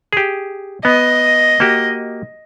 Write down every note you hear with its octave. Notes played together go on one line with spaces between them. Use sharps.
G4 G#4
B3 D#5
A#3 F#4 G4